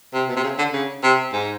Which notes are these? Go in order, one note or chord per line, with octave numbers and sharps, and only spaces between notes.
C3
B2
C3
C#3
D3
C#3
C3
G#2